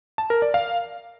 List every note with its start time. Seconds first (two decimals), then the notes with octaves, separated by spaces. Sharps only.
0.18 A5
0.30 A#4
0.42 D5
0.54 F5